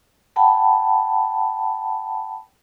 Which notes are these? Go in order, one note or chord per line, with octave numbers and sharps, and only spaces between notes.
F#5 G5 A5 B5